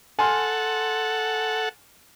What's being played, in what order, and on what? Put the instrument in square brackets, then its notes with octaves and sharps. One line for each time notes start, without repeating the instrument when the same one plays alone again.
[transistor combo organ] A4 F#5 [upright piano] G#5 C6 F6